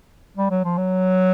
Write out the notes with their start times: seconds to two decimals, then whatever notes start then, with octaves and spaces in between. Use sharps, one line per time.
0.37 G3
0.51 F#3
0.64 F3
0.78 F#3